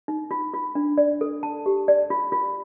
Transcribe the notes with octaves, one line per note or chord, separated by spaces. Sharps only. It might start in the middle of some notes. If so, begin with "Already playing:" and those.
D#4
F4
F4
D4
D5
A4
A5
G4
D5
F4
F4